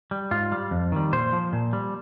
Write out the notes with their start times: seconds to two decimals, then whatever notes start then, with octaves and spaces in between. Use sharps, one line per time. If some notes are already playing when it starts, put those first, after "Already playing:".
0.11 G3
0.31 G#2 F4
0.52 G3
0.71 F2
0.92 D#3 G3
1.12 A#2 C5
1.33 F3
1.53 A#2
1.73 G3